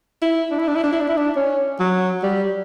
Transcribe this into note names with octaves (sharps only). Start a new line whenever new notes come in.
E4
D4
E4
D4
E4
D4
E4
D4
E4
D4
C#4
F#3
G3